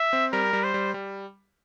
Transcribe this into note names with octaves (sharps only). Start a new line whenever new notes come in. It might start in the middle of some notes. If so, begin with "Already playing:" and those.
Already playing: E5
C4
G3 A#4
G3
C5
G3
G3